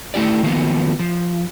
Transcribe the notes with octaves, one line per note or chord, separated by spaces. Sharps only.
A3 E4 G4 D5
D#3 F3 F#3 A#3 B3
F3